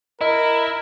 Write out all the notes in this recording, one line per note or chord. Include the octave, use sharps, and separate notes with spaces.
E4 A#4 D#5